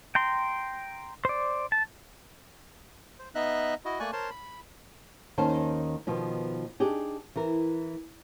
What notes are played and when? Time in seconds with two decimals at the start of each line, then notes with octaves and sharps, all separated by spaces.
0.15 G5 A#5 C6
1.25 C5 D5
1.72 A5
3.19 C5
3.35 B3 D#4 D#5 E5 F#6
3.85 E4 F#4 D#5
4.00 A3 A#3 D5 G#5 C#6 F#6
4.13 A#4 C5 C#5 A5 C6
4.30 B5
5.38 D#2 D#3 C#4 C5 A5
6.07 B2 D#3 F3 B3
6.80 D4 D#4 G4 G#4
7.36 E3 E4 A#4